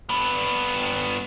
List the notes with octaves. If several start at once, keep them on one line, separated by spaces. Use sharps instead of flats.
G2 B3